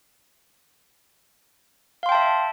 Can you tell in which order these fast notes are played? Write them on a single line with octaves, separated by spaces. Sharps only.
F5 C6 G5 A5 E5